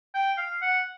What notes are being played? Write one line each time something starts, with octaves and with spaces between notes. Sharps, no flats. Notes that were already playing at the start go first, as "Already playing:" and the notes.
G5
F5
F#5